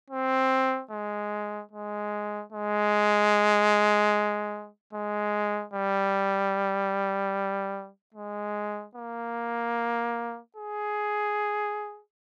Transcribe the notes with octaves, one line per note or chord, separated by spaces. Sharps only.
C4
G#3
G#3
G#3
G#3
G3
G#3
A#3
G#4